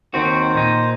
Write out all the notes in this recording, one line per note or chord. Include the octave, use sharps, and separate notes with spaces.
D#2 D#3 C4 F#4 C5
A#2 D#4